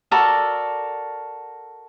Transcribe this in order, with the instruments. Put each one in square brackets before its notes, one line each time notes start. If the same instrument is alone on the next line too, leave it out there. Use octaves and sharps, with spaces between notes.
[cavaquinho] F#4 A4 A#4 D5